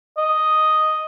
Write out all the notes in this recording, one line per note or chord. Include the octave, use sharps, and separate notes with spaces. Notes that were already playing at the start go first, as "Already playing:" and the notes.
D#5